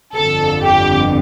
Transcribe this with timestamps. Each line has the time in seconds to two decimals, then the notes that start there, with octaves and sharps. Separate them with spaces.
0.15 G1 F2 D3 A4
0.63 G4